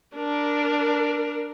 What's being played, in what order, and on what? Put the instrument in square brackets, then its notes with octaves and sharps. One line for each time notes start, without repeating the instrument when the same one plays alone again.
[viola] D4 A#4